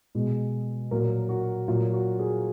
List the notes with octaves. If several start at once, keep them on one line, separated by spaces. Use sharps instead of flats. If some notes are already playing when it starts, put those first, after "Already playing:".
B2 G#3
A#2 F#3 A#3 A#4
F#4
A#2 F#3 A#3 F4
F#4
G#4